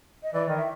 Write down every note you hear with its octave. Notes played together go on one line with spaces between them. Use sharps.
D#5
E3 D5
D#3 D#5
E5